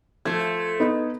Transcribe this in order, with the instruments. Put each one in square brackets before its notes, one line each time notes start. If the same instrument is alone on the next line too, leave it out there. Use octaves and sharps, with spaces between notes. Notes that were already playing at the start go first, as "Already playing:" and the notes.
[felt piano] F3 F4 G#6 [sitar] A3 C5
[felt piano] B3 D#4